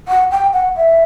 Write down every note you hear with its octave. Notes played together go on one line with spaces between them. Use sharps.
F#5
G5
F#5
E5